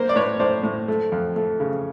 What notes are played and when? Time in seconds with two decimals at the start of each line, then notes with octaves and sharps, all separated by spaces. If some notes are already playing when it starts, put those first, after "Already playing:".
Already playing: A#3 A#4 C5
0.09 D5
0.16 A2 B4 C#5
0.39 A2 C5 D5
0.63 A2
0.88 A3
1.12 F2
1.36 A3
1.60 C#3